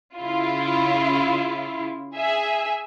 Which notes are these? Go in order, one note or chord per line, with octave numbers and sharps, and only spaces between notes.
C#3 E4 F4
G#4 E5 G#5